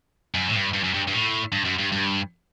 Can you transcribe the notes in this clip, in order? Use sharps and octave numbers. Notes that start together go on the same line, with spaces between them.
F#2
A2
G2
G2
F#2
G2
G2
A2
G2
F#2
G2
G2